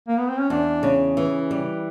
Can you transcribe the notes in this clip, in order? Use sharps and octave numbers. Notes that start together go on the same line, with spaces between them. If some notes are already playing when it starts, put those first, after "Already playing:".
A#3
B3
C4
C#4
E2 D4
C#3
E3
G3